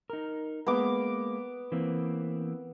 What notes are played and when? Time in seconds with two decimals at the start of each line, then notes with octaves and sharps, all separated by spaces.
0.10 D#4 A#4
0.67 G#3 A#3 B3 D6
1.72 E3 A#3 C4